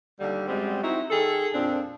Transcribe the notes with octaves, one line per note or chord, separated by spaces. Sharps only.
D#2 D3 G3
F#2 G3 G#3 C4
C4 D#4 E4 F#4
D#3 G#4 A4
F2 A#2 C4 D4